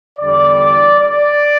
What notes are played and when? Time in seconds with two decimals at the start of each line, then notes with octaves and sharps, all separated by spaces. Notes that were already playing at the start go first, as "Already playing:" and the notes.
0.19 E2 D3 G3 D5
1.00 D5